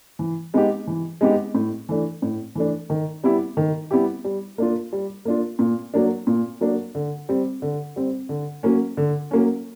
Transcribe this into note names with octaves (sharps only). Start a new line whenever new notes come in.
E3
G#3 B3 D#4 G4
E3
G#3 B3 D#4 G4
A2
E3 A3 D4
A2
E3 A3 D4
D#3
G3 B3 E4 G4
D#3
G3 B3 E4 G4
G3
A#3 D4 F4
G3
A#3 D4 F4
A#2
F#3 A#3 D4
A#2
F#3 A#3 D4
D3
G3 C4
D3
G3 C4
D3
F#3 A#3 C#4
D3
F#3 A#3 C#4